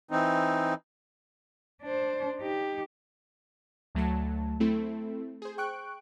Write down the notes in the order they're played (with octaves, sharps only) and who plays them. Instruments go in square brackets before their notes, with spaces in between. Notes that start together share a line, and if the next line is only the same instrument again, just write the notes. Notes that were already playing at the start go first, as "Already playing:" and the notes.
[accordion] E3 C4 D#4
[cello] D4 C5
D#4 G4
[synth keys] D2 F#3 A3 A5
A3 C4 E4 A4
G#4 C5
G5 C#6 F#6 D7